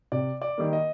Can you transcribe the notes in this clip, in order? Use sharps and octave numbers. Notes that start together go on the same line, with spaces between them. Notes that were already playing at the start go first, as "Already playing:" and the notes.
C3 D5
D5
D#3 G3 A#3
D#5